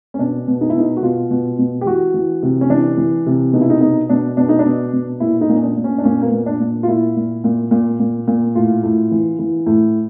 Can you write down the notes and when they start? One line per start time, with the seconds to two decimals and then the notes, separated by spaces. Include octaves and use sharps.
0.14 C#4
0.19 B2 D4
0.48 B2
0.61 D#4
0.70 E4
0.75 B2 D#4
0.97 F#4
1.03 B2 F4
1.31 B2
1.59 B2
1.81 G4
1.86 E3 F#4
2.14 E3
2.43 C3
2.61 C#4
2.70 E3 D4
2.97 E3
3.26 C3
3.53 B2 D#4
3.61 E4
3.70 D#4
3.81 B2 D#4
4.09 B2 D4
4.37 B2 D4
4.49 D#4
4.59 D4
4.66 B2
4.93 B2
5.20 A#2 E4
5.41 D#4
5.49 A#2 C#4
5.63 D4
5.77 A#2
5.84 C#4
5.98 D4
6.04 A#2 C#4
6.22 A#3
6.25 B3
6.32 A#2
6.46 D4
6.60 A#2
6.83 F4
6.87 A#2 E4
7.16 A#2
7.44 A#2
7.71 A#2
8.00 A#2
8.27 A#2
8.55 A2 F4
8.83 A2
9.11 E3
9.39 E3
9.66 A2